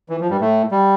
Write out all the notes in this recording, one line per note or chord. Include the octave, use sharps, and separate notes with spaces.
E3
F3
G2 G3
A2 A3
G3